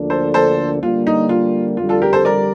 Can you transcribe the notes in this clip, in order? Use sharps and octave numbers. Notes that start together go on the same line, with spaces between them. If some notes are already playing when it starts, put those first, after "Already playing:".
Already playing: D2 D3 F3 A#3 D4
A4 C5
A4 C5
D3 G3 A#3 F4
D#4
F4
F2 D3 G3 F4
F4 A4
G4 A#4
A4 C5
A#4 D5